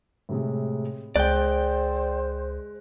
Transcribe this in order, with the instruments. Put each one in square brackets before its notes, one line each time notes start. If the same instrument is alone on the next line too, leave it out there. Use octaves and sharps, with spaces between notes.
[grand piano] A2 C3 G#3
[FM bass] C#2 [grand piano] G#3 F#6 G6 [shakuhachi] C5 [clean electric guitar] D5 G5